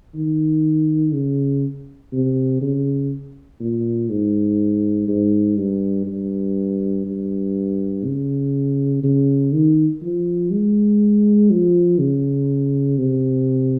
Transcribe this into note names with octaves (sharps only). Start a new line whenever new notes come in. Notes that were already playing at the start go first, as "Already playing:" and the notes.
D#3
C#3
C3
C#3
A#2
G#2
G#2
G2
G2
G2
C#3
C#3
D#3
F3
G#3
F3
C#3
C3